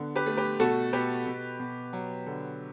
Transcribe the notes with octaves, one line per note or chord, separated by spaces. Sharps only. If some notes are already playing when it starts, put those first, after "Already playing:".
Already playing: D3 B3
G4 B4
A3
G4 B4
B2 F#4 A4
B2 G4 B4
B2
B2
F#3
D3